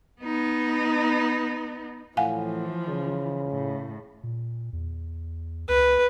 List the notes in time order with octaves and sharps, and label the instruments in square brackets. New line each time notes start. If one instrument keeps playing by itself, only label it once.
[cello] B3 D#4
[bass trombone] A2 [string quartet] E3 F3 [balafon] F5 F#5 G#5
[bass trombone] C#3
[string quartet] A2
[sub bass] A#2
E2
[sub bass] C#2 [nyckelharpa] B4